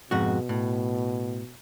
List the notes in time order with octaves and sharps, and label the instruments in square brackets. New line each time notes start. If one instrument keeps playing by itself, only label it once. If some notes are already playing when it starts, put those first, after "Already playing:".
[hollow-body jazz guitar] F2 G#2 F#4 [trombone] B2
[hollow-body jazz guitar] A2